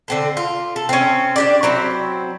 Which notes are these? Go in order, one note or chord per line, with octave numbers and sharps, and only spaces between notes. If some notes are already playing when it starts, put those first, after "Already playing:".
D3 C4 A4
F4
A4
C4 C#4
D4 G4 D5
F#3 C4 E4